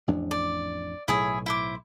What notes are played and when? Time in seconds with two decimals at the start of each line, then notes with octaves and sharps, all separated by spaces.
0.07 A1 F2 D4
0.31 D5
1.08 B1 A2 E4 G#4 C#5
1.46 E4 C5 D6